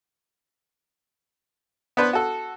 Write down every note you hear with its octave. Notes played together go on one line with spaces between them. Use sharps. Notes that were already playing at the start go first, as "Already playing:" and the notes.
B3 D4 B4 C5
F#4 A4